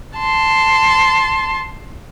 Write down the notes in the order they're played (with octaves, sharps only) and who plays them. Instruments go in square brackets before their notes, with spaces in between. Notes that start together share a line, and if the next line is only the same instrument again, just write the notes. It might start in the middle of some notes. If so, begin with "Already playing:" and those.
[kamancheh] A5 C6